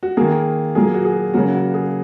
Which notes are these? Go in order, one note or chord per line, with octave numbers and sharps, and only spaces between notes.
F#4
D#3 A#3 G#4
A#2 F#3 A#3 G#4
F#4
G#4
C#3 F#3 A#3 F#4
F#4
G#4